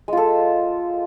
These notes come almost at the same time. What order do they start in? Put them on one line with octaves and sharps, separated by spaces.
G#3 F4 A4